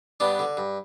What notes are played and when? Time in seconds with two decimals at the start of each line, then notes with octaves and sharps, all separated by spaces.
0.20 G2 B3 D4
0.39 D3
0.57 G2